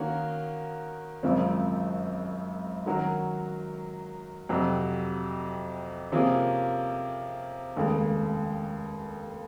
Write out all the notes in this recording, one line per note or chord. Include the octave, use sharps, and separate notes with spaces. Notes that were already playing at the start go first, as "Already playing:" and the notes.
Already playing: D#3 A#3 C#4 F#4 A#4
G#1 F#2 C#3 F3 C4
D#3 F#3 C#4 F#4 A#4
F2 C3 F#3
C3 F3 A#3 C#4 G#4
F1 D#2 C#3 G#3